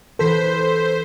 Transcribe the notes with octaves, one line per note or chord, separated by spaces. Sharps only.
E3 A4 B4 C5 B6